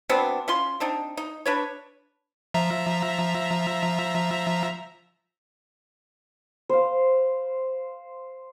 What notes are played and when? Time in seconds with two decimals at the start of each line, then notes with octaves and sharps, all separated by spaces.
0.09 F#3 B3 C4 D4
0.48 C#4 F4 C6
0.80 C4 D4 D#4
1.17 D#4
1.46 D4 B4 C#5
2.54 F3 E5 A#5
6.69 C5 F5